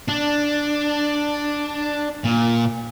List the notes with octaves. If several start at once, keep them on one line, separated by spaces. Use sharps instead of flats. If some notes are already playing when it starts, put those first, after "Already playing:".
D4
A#2